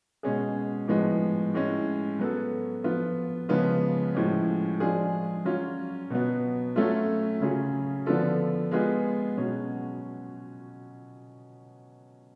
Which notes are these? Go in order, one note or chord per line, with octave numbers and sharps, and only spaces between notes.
B2 G#3 C#4 G#4
A2 F3 G#3 B3
A2 G#3 C#4
F#3 B3 F#4 A4
F3 B3 F4
C#3 F3 G#3 B3 F4
A2 F3 G#3 C#4
F3 G#3 D4 F4 G#4
F#3 C#4 F4
B2 F#3 B3
F#3 A3 C#4 F4 A4
C#3 F#3 C#4 F4 G#4
D3 F3 B3 F4 A4
G#3 B3 F4 G#4
B2 F#3 C#4